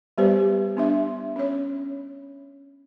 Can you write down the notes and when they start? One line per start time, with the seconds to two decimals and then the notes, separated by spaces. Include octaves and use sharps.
0.18 G3 B3 G4 B4 C5 D5
0.77 B3 D4 E5
1.36 C#4 C#5